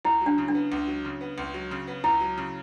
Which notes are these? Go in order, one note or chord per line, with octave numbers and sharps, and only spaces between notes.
C#2 E4
F#3 D4
C#3
D4
B3
C#2
F#3
C#3
B3
C#2
F#3
C#3
B3
C#2 E4
F#3
C#3